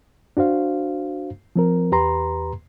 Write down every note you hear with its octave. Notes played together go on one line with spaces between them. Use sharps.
D4 F#4 C5 F5
F3 C4 A#4
E2 G4 B4 A#5 C6